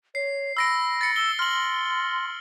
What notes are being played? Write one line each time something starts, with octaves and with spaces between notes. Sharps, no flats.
C#5 C7
B5 E6 A#6 D7
A6 C#7
E6 G7
C6 F6 F#7